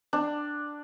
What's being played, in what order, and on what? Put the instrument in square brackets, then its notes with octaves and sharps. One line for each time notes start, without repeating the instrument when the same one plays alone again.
[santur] D4